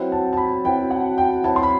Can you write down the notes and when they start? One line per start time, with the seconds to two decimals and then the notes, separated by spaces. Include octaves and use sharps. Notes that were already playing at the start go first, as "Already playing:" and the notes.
Already playing: F#3 C4 E4 B4
0.12 A5
0.33 A5
0.37 B5
0.65 F#3 C4 E4 B4 G5
0.91 F#5
1.18 G5
1.44 F#3 C4 E4 B4 A5
1.56 C6
1.63 B5